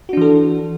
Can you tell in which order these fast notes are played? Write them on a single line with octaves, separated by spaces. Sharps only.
F#4 D4 E3 A4